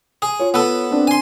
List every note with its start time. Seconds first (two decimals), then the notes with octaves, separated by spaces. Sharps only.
0.22 G#4
0.39 F4 C#5
0.54 B3 A4
0.91 C4 D4
1.07 G#5 C6